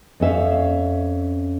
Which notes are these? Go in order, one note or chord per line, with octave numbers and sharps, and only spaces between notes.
F2 C#4 E5 F5